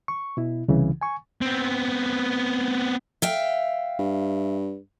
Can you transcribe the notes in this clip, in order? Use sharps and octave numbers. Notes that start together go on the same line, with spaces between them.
C#6
B2 E4
C2 C#3 E3
G#5 C#6
B3 C4
E5 F5 G5
G2